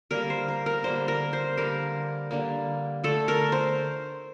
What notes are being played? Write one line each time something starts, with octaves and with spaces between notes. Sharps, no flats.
D3 G3 A#3 A#4
C5
A#4
A#4
D3 G3 A#3 C5
A#4
C5
D3 G3 A#3 A#4
D3 G3 A#3
D3 A3 A4
A#4
C5